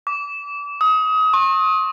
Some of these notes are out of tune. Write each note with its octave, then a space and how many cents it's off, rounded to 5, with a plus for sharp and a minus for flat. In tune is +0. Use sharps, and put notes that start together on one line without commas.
D6 -30
D#6 +30
C#6 -45